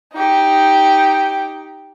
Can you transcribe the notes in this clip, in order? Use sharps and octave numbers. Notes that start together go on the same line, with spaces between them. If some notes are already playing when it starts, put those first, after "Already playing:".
D#4 G4